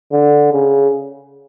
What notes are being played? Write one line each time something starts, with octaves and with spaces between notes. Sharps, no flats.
D3
C#3